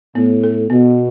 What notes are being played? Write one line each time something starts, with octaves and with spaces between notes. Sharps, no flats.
A2 B3
A4
B2 B3